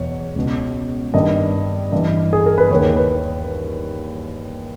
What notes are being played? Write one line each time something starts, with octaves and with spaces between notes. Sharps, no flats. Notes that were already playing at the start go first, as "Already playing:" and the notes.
Already playing: E2 B2 C#5
C#2 B2
G2 D#3 D#5
G2 E3
G#4
A#4
B4
D#2 D#3 C#5
B4